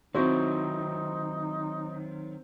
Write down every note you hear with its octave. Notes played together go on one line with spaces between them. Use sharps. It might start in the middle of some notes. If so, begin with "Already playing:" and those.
D#3 F#3 C4 D#4 E4 F#4 C5